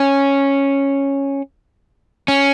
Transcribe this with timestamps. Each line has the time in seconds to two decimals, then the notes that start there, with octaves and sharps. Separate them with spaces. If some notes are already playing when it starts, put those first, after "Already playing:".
Already playing: C#4
2.28 C#4